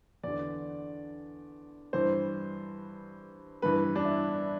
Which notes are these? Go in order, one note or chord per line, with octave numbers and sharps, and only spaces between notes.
E2 D3 D5
G2 E3 C5
G2 E3 B4
D4
E4